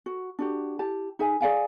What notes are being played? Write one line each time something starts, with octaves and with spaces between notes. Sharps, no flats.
F#4
D4 F#4 G4
E4 G4 A5
D#4 G#4 E5 G#5
G#4 D5 F5 G#5